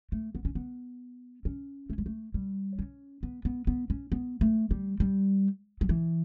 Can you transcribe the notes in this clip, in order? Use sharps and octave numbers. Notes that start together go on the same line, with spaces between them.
A3
B3
C#4
B3
C#4
A3
G3
A3
G3
C#4
B3
B3
B3
C#4
B3
A3
G3
G3
F#3
E3